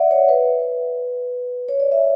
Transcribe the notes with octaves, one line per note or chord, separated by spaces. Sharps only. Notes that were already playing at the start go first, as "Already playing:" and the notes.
Already playing: D5 E5 F#5
C#5
B4
C#5
D5
E5